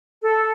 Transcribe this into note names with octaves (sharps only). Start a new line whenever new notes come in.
A4